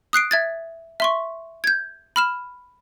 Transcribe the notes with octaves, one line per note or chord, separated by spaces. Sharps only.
D#6 F#6 C7 D7
E5 G#6 A6
E5 C6 C#6
G6 G#6
B5 F6 E7